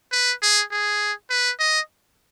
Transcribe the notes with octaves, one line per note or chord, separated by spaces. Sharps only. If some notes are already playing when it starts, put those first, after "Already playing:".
B4
G#4
G#4
B4
D#5